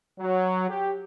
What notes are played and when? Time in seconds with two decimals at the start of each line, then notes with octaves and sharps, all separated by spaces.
0.19 F#3
0.69 G4